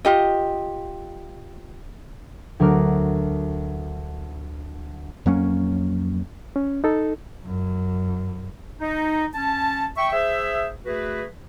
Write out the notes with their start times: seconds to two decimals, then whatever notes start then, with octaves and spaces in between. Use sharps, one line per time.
0.05 F4 G4 D#5
2.60 D2 F#3 A#4 D6 F6 F#6
5.26 F2 F#3 A#3 C#4
6.56 C#4
6.84 D#4 A4
7.46 F#2
8.79 D#4
9.34 C#4 A5
9.97 E5 G5 C#6
10.12 G#4 C5 E5
10.85 A3 F#4 G#4 B4